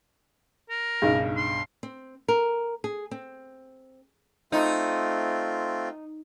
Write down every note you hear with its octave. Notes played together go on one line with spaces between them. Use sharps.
A#4
B1 G2 C#3 D#4
C6
C4
A#4
G#4
C4
A3 C4 D#4 F4